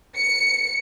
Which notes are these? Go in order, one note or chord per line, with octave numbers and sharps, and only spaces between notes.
C#7